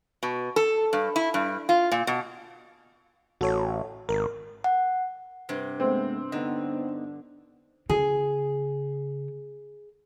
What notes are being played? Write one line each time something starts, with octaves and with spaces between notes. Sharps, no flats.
B2
A4
G2
E4
G2
F4
A#2
B2
A1 F#4 A4 C#5
G#1 A#4
F#5
G2 C3
G#3 A3 B3 C4
D3 B3 D#4 D#5
C#3 G#4